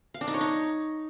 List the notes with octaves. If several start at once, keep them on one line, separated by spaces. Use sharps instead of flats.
F5
D4
D#4
C#5
D#4